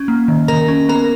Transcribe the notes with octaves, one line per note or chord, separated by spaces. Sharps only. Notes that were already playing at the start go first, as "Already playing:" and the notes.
Already playing: C#4
A#3
D#3
D#3 A#4 A#5
C#4
B3 A#4 A#5